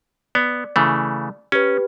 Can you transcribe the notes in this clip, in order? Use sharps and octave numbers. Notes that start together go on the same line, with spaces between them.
B3 D5
C#3 E3 A3
C#4 G4 B4